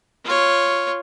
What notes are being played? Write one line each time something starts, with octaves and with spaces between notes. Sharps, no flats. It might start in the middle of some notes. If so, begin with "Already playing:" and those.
F4 C#5